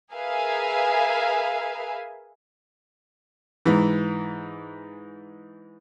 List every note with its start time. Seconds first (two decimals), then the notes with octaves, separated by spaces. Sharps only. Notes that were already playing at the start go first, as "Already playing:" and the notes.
0.13 G#4 A#4 B4 E5 F5 G#5
3.65 G#2 E3